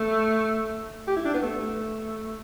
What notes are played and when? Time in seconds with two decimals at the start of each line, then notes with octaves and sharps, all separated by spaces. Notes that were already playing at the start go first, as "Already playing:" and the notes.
Already playing: A3
1.07 G4
1.16 E4
1.25 D4
1.34 B3
1.42 A3